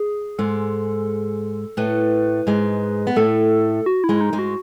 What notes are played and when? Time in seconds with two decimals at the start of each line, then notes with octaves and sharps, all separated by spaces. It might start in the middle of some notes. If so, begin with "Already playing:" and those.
Already playing: G#4
0.38 G#2 G#3 A4
1.77 A2 A3 B4
2.47 G#2 G#3
3.07 B3
3.16 A2 A3 A4
3.86 F#4
4.04 E4
4.09 G#2 G#3
4.21 D#4
4.33 G#2 G#3
4.39 F#4